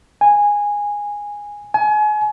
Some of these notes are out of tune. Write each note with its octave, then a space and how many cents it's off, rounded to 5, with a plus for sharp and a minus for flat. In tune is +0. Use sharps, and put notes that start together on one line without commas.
G#5 -10
G#5 +35